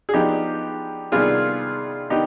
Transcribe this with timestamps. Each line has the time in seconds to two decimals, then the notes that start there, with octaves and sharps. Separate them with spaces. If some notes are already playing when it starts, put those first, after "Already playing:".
0.09 G#4
0.13 F3 B3 D4 D#4 G4
1.12 C3 D#3 G3 B3 D4 F4 G#4
2.10 D#3 B3 D4 D#4 G4